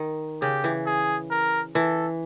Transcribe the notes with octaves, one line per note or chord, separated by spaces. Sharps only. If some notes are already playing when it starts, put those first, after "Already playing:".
Already playing: D#3
C#3 G4
E3
G#4
A#4
E3 A4